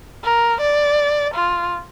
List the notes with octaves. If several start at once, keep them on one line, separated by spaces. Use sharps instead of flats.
A#4
D5
F4